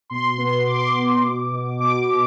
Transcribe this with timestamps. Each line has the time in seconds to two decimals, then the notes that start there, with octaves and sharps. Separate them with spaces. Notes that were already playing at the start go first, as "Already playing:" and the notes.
0.10 B2 C6
0.38 B3 C6
0.67 B2 D6
0.74 C6
0.81 D6
0.95 B2
1.23 B2
1.52 B2
1.79 B2 D6
2.08 B2